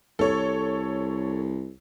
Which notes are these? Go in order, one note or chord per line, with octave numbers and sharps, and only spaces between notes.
C2 A4 C#5